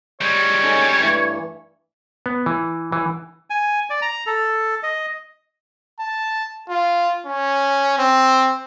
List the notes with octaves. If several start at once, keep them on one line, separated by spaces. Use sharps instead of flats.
G3 G#3 C#5
C#4 D#4 A4
G2 E3 A3
B3
E3
E3
G#5
D5
A#5
A4
D#5
A5
F4
C#4
C4